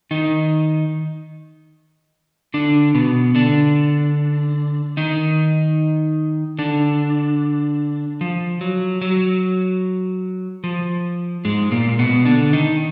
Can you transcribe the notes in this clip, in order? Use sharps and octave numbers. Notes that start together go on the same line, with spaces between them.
D#3 D#4
D3 D4
B2 B3
D3 D4
D#3 D#4
D3 D4
F3
F#3
F#3
F3
G#2 G#3
A#2 A#3
B2 B3
D3 D4
D#3 D#4